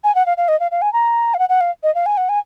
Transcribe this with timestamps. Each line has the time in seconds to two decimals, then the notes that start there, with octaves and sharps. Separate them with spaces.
0.04 G#5
0.15 F#5
0.26 F5
0.37 F5
0.48 D#5
0.60 F5
0.71 F5
0.82 G#5
0.93 A#5
1.34 F5
1.39 F#5
1.49 F#5
1.61 F5
1.83 D#5
1.95 F5
2.06 G#5
2.17 F#5
2.29 G#5